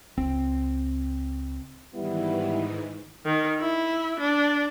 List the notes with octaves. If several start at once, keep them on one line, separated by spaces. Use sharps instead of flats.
C#2 C4
G#2 D#3 E3 G3 B3 E4
D#3
E4
D4